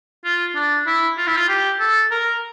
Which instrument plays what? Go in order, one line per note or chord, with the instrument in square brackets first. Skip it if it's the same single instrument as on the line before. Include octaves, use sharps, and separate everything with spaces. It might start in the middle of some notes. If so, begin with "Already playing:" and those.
[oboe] F4
D4
E4
F4
E4
F4
G4
A4
A#4